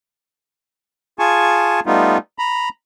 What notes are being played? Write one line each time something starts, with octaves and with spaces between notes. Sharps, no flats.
F4 G#4 G#5 A5 C#6
G3 A3 B3 D#4 F4
A#5 B5